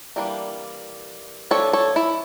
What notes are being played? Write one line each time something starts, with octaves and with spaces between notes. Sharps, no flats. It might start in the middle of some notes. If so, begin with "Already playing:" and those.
E3 G3 A#3 D4
F3 A3 D4 A4 C#5
A4 C#5
E4